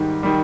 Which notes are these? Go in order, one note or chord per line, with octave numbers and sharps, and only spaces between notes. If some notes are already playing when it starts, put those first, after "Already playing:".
Already playing: G#2 D#3 G3
D#3 G3